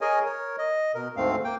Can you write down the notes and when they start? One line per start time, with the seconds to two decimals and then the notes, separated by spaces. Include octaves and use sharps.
0.01 G#4 A#4 C#5 D#5 G#5
0.26 A#4 C#5
0.58 D#5
0.95 B2 A#4
1.17 D2 G#2 A3 C4 F5
1.44 A#3 G5